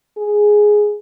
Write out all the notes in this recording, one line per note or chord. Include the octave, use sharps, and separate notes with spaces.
G#4